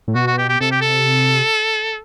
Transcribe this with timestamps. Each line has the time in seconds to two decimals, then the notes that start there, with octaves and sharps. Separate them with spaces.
0.08 A2
0.15 B2 F#4
0.27 F#4
0.38 G4
0.49 G4
0.60 C3 A4
0.71 G4
0.81 A4